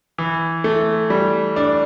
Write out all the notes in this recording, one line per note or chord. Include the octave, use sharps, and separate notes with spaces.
E3
A3
G3
D4